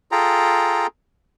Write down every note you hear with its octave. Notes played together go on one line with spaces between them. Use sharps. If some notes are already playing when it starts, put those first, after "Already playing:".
F4 G#4 A4 G5 A#5